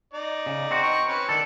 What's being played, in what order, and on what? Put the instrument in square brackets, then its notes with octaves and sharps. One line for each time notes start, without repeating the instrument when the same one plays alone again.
[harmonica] D#4 D5
[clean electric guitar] C#3
C4 F#4
[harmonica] D#4 C#6
C#4 B4 C#5
[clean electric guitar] D#3 A4 [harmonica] D4